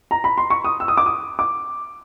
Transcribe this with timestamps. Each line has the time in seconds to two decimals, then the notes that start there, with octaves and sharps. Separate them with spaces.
0.11 A#5
0.24 B5
0.38 C6
0.50 C#6
0.64 D#6
0.80 E6
0.88 D#6
0.97 D6
1.06 D#6
1.39 D6